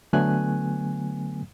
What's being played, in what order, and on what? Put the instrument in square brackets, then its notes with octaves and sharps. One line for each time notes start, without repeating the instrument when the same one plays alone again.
[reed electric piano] D3 F#3 A3 B3 G#5 F#6